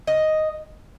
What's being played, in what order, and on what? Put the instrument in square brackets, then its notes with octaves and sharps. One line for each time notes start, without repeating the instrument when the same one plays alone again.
[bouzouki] D#5